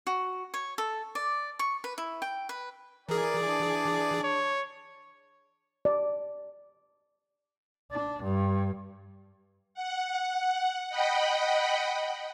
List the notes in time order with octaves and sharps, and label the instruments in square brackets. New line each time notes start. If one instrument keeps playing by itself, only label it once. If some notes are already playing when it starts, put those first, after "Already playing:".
[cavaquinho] F#4
C#5
A4
D5
C#6
B4
E4
G5
B4
[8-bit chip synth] E3 G#4 [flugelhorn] A#4 [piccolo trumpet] D5
[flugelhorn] D4
[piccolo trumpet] C#5
[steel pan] D5
[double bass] D4
G2
[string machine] F#5
D#5 F#5 G5 B5